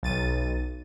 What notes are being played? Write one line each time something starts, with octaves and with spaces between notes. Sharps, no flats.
B1 A6 D#7